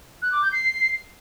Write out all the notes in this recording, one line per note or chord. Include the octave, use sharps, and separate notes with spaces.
F#6
D6
G6
C7